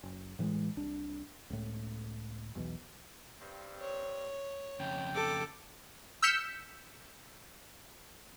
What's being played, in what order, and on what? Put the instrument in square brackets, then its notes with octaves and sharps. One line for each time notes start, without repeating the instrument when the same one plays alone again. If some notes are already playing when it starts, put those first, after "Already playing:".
[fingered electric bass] F#1
A2 E3 F3 G#3
C2 D4
C#2 A2
B1 E2 B2 E3
[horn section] G2 C4
[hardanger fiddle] C#5
[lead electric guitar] F2 C#3 [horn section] G5
[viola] A4 [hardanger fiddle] D6
[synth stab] E6 F6 G6 B6 C#7 E7